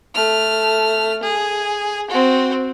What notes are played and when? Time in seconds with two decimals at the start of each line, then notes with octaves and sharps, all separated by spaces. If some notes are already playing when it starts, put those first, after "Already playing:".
0.15 A3 F6
1.23 G#4
2.10 C4 F#4